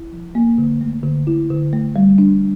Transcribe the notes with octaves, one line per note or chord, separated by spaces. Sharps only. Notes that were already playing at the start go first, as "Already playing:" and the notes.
Already playing: E4
F3
A#3
D3
A3
D3
E4
D3
A3
G3
D4